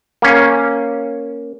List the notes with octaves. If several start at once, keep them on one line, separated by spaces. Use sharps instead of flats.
A#3 C#4